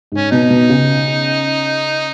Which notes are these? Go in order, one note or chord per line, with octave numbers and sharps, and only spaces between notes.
G#2 C#4
B2 D#4
B2
C#3